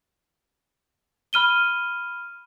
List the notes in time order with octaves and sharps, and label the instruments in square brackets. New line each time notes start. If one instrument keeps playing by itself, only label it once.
[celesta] B5 F6 D#7 G7